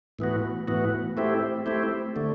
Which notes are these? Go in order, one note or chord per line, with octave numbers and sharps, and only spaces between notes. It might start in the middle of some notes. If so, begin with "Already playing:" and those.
A2 E3 B3 F#4
A2 E3 B3 F#4
A3 C4 E4 G4
A3 C4 E4 G4
D3 A3